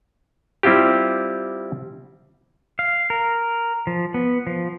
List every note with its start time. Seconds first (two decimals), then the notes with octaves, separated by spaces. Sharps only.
0.63 G3 C4 E4 F4 G4
2.79 F5
3.10 A#4
3.87 F3
4.14 B3
4.47 F3